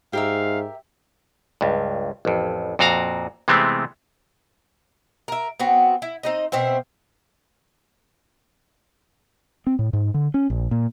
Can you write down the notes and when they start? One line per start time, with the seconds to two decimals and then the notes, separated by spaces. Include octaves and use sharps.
0.13 G#2 G4 A#4 E5 F5
1.61 C#2 G2
2.25 A1 F2
2.79 F2 A#2 F#4 F5 A#5
3.48 C3 E3 G#3 A3 B3 C4
5.28 A#4 E5
5.59 B3 C4 F#4
6.02 E4
6.23 C4 D#4 D#5
6.52 B2 C4 C5 E5
9.67 C4
9.79 A2
9.93 G#2
10.14 D3
10.34 C#4
10.50 A#1
10.71 A#2